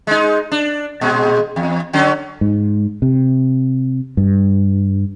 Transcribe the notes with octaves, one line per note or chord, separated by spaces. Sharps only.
G#3 D#4
D4
A#2 G#3
E2
D3 F#3 C#4
G#2
C3
G2